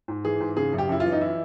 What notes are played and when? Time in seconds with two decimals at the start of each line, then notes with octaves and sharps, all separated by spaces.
0.08 G#2
0.24 E3 G#4
0.40 G#2
0.57 C#3 G#4
0.73 F#2
0.78 G4
0.89 F#2 E4
1.00 F4
1.05 E3
1.12 D#4
1.21 E4